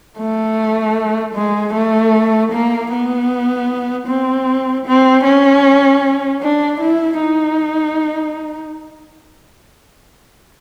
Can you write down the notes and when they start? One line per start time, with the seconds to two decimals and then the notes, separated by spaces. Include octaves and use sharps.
0.18 A3
1.35 G#3
1.74 A3
2.52 A#3
2.92 B3
4.07 C4
4.86 C4
5.24 C#4
6.42 D4
6.81 E4
7.19 D#4